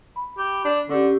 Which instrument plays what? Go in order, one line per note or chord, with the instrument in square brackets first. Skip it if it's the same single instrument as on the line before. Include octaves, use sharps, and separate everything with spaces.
[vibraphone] B5
[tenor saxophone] G4
D4
[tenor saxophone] D3 [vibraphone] C#4 G4